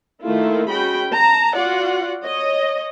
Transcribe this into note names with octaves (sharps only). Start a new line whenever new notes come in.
D#3 A3 A#3 E4 F4
G#3 C#4 F#4 G5 B5
A5 A#5
F4 F#4 D5 F#5
C#5 D#5